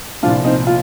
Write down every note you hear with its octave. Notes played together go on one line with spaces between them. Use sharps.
C2 A#2 F3 D4 F4
C4 D#4
F4